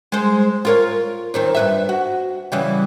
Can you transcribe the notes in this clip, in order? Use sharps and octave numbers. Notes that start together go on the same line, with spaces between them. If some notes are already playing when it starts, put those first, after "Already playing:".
G#3 C5
F4 A#4 C#5
D#2 D#3 C4
G2 B4 E5
F#4
C#3 E3 G3